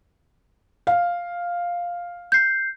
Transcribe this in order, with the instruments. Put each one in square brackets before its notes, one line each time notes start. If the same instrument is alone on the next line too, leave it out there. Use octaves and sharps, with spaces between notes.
[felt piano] F5
[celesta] G6 C7